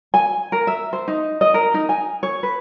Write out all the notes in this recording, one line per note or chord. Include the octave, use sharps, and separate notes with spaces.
G#5
A#4
E5
C5
D#4
D#5
A#4
D#4
G#5
C#5
B4